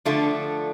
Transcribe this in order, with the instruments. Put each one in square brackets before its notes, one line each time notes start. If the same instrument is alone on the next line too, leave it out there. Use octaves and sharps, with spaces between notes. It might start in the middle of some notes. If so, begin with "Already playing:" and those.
[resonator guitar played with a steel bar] D3 F3 A3 D4 F4